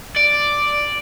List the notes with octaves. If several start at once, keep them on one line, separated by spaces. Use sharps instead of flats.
D5